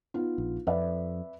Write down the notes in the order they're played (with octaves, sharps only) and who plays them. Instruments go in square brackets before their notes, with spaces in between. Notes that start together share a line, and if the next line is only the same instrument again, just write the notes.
[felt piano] B3 D#4 F4
[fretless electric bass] A#1
[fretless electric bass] F2 [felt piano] B4 D5 E5